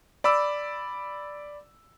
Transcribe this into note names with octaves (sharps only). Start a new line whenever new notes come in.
D5 B5 D6 E6